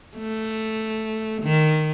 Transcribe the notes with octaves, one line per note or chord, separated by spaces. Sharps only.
A3
D#3